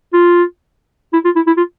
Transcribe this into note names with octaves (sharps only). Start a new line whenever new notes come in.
F4
E4
F4
E4
E4
F4